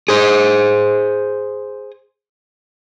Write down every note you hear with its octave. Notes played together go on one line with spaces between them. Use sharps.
G#4 C5